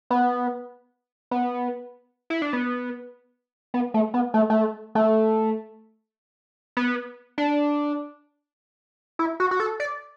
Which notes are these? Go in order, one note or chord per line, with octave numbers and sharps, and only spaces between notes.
B3
B3
E4
D4
B3
B3
A3
B3
A3
A3
A3
B3
D4
E4
F#4
F#4
A4
D5